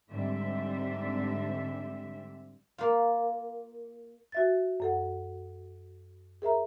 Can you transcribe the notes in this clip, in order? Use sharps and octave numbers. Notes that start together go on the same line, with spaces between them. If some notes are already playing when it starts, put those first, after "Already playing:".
G#2 D3 G3 C4 E5
A#3 F4
F#4 E5 A6
F#2 A4 F#5
G#4 A#4 E5 A#5